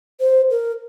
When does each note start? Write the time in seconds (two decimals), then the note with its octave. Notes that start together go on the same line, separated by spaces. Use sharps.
0.20 C5
0.51 A#4